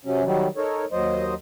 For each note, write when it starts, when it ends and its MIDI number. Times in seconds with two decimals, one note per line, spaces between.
0.05 0.24 48
0.05 0.24 54
0.05 0.24 61
0.24 0.48 51
0.24 0.48 54
0.24 0.48 55
0.57 0.85 63
0.57 0.85 69
0.57 0.85 70
0.57 0.85 73
0.92 1.34 39
0.92 1.34 54
0.92 1.34 72
0.92 1.34 75